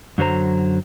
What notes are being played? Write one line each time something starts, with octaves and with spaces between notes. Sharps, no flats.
F#2 D3 F#3 C5 A#5